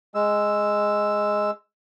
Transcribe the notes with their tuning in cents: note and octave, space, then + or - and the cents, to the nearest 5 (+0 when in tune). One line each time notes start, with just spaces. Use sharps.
G#3 +0 E6 +0